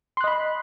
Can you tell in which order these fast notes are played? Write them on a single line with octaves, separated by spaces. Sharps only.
C6 F#6 D#5 B5